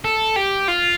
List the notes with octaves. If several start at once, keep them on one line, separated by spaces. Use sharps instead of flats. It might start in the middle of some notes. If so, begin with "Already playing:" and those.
A4
G4
F4